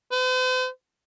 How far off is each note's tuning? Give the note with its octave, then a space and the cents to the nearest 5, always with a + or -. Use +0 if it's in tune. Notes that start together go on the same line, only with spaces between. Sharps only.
C5 -45